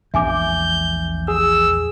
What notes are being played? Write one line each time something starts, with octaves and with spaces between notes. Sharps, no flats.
A#1 E2 G#3 E5 G#5 D6 G6
G#4 E6